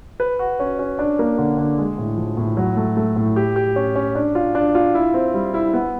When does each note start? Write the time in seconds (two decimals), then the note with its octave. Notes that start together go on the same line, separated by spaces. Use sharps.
0.20 B4
0.39 F#4
0.60 C#4
0.79 C#4
0.99 D4
1.19 A#3
1.38 D3
1.58 D3
1.78 G#3
1.98 A2
2.18 F3
2.37 A2
2.57 F#3
2.77 A3
2.97 A3
3.16 A2
3.36 G4
3.56 G4
3.76 C#4
3.96 C#4
4.15 D4
4.35 F4
4.55 D4
4.75 F4
4.95 E4
5.14 C4
5.34 G3
5.54 E4
5.74 B3